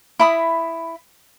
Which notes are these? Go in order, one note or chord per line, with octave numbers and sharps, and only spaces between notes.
E4 B5 D#6